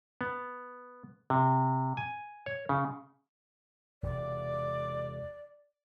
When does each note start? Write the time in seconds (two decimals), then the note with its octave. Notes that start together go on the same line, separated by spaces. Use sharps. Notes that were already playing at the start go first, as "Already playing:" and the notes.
0.21 B3
1.30 C3
1.97 G#5
2.46 C#5
2.69 C#3
4.03 E1 C3 D5